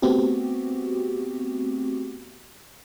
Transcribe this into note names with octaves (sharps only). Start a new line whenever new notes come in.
A3 B3 C4 F#4 G4